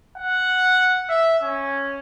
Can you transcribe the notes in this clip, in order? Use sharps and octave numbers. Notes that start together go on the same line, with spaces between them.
F#5
E5
C#4